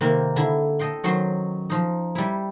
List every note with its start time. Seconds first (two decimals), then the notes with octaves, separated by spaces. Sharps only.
0.01 C3 D#3 A#3 C4
0.36 D3 E4
0.79 A4 D#5 G5 C6
1.04 D#3 F#3 C#4 C5 C6
1.70 F3 D#4
2.15 G3 E4